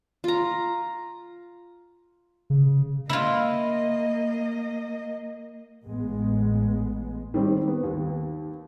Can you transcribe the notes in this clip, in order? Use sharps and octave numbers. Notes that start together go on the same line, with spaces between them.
F4 A#5
C#3
A#3 E4 F4 D#5
A1 A2 G#3 B3
D#3 G3 C4 D#4
B3
D#2